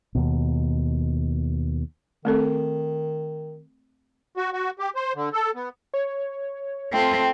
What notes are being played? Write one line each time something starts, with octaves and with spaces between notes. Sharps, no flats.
D#2 B2
D#3 A3 C4 A4
F#4
F#4
G4
C5
D3
A4
B3
C#5
A3 C4 F4 G5